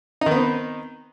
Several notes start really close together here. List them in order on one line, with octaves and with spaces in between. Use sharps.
D#4 D#3 B3 C4